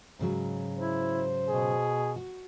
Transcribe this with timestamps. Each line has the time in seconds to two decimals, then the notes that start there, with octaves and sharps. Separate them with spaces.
0.19 G#2 C#3 F#3
0.79 E4 C5
1.48 B2 G#4
2.16 F#4